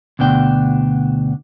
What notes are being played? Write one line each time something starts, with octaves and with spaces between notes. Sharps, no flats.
D2 B2 D4 G5